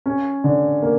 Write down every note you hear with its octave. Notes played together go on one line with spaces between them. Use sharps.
C#4
D3
A#3